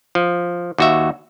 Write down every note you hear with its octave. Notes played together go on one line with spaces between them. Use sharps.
F3
D#2 F#4 E5